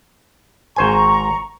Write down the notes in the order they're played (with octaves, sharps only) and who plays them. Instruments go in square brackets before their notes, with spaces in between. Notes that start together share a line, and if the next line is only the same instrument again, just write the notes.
[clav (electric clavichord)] G#1 C5 G#5 [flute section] A#5 C#6